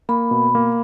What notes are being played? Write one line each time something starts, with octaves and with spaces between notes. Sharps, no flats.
A#3 B5
B2
A#3